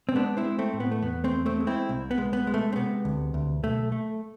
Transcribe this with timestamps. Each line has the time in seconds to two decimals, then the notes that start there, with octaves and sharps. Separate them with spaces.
0.09 C4
0.15 G#3 B3 D4
0.37 C4 E4
0.45 G#3
0.59 A3 C4
0.73 A2
0.80 B3
0.92 A3
1.02 E2 B3
1.24 A3 C4
1.31 E2
1.46 A3 C4
1.60 G#3
1.67 C4 E4
1.89 C2
2.11 B3
2.18 G#3
2.33 B3
2.47 G#3
2.54 A3
2.72 C4
2.76 C3 B3
3.05 D2
3.34 D2
3.63 B1 A3
3.92 A3